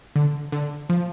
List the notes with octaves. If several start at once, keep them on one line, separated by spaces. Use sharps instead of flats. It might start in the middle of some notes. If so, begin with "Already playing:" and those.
D3
D3
F3